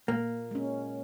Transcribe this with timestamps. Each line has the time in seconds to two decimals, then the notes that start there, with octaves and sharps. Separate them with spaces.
0.08 A#2 A#3
0.51 G#3 C#4